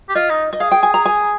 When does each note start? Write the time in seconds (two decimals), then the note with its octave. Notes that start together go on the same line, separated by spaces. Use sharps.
0.09 G4
0.15 F4 D#5
0.30 D#4
0.53 D#5
0.60 G#4 F5
0.71 G5
0.83 G#5
0.94 A#5
1.05 G#5